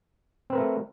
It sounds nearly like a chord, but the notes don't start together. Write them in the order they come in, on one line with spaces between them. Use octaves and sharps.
C4 B4 A#4 A3